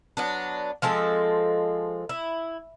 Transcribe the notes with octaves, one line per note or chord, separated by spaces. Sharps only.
F#3 B3 D4
F3 G#3 C4 A4
E4